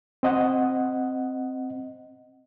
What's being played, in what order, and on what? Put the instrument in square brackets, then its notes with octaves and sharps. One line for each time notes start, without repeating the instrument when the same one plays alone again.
[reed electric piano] C4 D#5 F#5